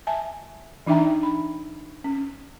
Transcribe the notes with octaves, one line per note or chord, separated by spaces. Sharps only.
E5 G#5 A5
E3 D4 D#4 E5 G5 A#5
B5
C#4